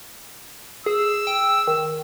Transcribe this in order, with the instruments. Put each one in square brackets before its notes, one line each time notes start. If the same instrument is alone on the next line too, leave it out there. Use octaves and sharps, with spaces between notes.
[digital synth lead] G#4 [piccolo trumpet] E6
[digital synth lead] G5
D#3